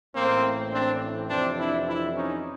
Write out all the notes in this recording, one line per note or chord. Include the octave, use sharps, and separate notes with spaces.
A1 A2 E3 A#3 C4
C4 D4
F2 C3 E3 C4 D4
D4 E4
D4 E4
C#4 D#4